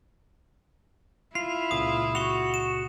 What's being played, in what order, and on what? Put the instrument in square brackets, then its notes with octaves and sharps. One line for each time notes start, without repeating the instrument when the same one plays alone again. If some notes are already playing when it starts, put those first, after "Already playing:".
[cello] E4 [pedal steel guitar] F4 [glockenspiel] C7
[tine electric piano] C#2 A#2 C#3 [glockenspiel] D#6
[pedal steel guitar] F#4 [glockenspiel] C#6 F7
[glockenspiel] E7